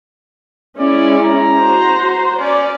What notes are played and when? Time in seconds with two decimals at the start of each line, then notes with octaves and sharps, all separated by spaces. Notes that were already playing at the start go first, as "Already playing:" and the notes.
0.79 G#3 C#4 E4 D5
1.23 A#5
1.55 F#4 C5
2.39 C#4 D5